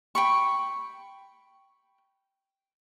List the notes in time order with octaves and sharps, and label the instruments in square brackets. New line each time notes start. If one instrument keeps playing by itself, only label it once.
[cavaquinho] G5 B5 C#6